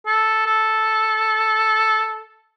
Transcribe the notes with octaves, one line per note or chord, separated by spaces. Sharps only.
A4
A4